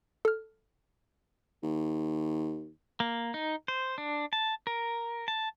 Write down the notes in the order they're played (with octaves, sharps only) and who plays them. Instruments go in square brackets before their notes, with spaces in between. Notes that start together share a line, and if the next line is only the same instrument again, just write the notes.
[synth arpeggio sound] A4 F6
[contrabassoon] D#2
[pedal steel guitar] A#3
D#4
C5
D4
A5
A#4
A5